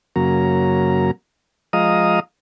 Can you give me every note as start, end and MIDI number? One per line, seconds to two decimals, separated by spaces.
0.16 1.11 42
0.16 1.11 49
0.16 1.11 54
0.16 1.11 58
0.16 1.11 82
1.73 2.20 53
1.73 2.20 56
1.73 2.20 75
1.73 2.20 77
1.73 2.20 82
1.73 2.20 87